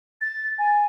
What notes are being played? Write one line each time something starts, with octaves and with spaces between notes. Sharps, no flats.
A6
G#5